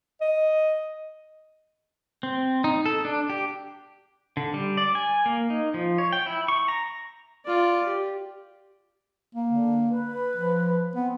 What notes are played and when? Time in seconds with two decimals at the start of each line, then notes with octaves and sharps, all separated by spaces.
0.21 D#5
2.23 C4
2.64 D#4
2.86 A4
3.05 D4
3.30 G4
4.37 D3
4.54 G3
4.77 D5
4.95 G#5
5.26 A#3
5.50 D#4
5.74 F3
5.98 C#5
6.13 G5
6.26 E4
6.48 C#6
6.68 A#5
7.45 F4 D5
7.86 G4
9.35 A#3
9.49 D3
9.90 B4
10.36 F3
10.95 B3 C4